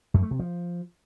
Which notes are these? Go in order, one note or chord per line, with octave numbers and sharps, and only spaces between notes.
F#2
A3
C3
F3